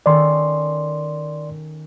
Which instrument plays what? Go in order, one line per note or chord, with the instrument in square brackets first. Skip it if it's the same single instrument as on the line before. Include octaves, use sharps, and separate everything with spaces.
[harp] D#3 C#4 A4 [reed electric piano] D5 C6